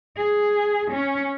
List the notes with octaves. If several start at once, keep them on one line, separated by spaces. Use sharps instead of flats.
G#4
C#4